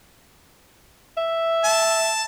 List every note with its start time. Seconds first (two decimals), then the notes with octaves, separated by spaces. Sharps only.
1.17 E5
1.64 A5